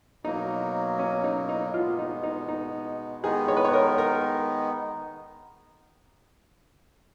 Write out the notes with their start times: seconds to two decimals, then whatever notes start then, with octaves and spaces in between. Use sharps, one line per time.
0.24 B2 F#3 A#3 D#4
0.99 C#4
1.24 D#4
1.49 D#4
1.74 B2 G#3 B3 F4
1.99 D#4
2.23 D#4
2.48 D#4
3.23 D#3 G#3 B3 D#4 G#4
3.48 C#5
3.57 B4
3.65 C#5
3.73 A#4
3.98 A#4